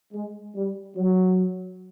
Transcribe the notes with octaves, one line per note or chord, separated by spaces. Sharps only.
G#3
G3
F#3